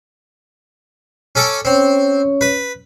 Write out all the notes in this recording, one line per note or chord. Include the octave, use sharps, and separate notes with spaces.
C#4 A4 D6
C4 C#4 C#5
B4